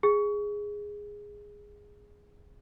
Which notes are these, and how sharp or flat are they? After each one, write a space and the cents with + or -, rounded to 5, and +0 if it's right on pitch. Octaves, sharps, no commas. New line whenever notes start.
G#4 -10